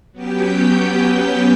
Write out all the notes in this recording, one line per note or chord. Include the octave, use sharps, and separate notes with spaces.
F#3 B3 C#4 G4 G5 G6